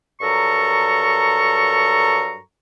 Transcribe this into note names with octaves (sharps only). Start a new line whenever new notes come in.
G2 F#3 A4 A#4 A#5 C#6